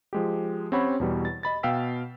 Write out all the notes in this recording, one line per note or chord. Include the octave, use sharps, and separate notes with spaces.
F3 G#3 G4
C4 C#4 G4 C#5 F#5 B5
E2 B2 G3
A6
D#5 B5 A6
B2 F5 G5 E6 B6